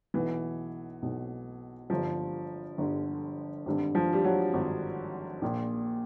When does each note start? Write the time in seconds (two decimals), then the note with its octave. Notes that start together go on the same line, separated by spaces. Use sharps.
0.14 B1 B2 E3
1.02 B1 B2
1.90 G1 G2 D3 F3
2.78 G1 G2 D3
3.66 G#1 G2 D3
3.95 F3
4.13 G3
4.24 F#3
4.54 G#1 G2 D3
5.42 A#1 A#2